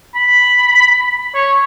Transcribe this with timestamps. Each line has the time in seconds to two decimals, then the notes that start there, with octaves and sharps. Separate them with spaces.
0.15 B5
1.35 C#5